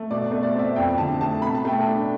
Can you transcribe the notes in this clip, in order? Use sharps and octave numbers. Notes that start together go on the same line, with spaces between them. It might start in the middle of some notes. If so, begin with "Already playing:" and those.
Already playing: A3
B2 D5
D5
A3
D5
C4 D5 E5
F2 G5
D3 A5
A3 A5
B2 B5
A5
A3 G5
A5
D4